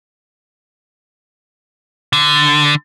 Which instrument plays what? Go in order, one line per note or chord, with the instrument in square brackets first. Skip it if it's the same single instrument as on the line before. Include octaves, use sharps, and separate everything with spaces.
[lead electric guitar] D3